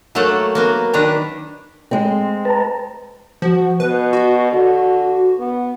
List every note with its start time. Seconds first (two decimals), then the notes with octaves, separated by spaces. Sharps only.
0.15 F#3 A3 A#3 A4 F#5
0.55 A#3 B3 F#4
0.93 D#3 D4 B4 A#5
1.91 G#3 C4
2.45 B4 A5 A#5
3.42 F3 F#4
3.80 B2 B4
4.13 F#4
4.52 D3
5.38 B3